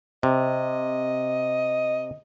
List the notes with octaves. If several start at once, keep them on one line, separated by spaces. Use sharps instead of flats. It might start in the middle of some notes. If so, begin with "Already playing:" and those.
C3 D#5